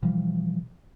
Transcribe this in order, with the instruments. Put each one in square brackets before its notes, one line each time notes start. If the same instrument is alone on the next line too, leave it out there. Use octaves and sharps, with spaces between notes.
[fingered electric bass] B2 E3 F3 G3